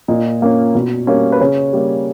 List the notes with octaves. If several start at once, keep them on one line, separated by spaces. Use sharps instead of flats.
A#2 D#5
A#3 C#4
B2
G3 A#3 C#4
B4
C#3 C#5
G3 A#3